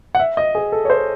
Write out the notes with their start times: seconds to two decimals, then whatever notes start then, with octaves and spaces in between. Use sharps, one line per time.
0.15 F#5
0.19 E5
0.37 D#5
0.55 G#4
0.72 A4
0.85 C#5
0.90 C5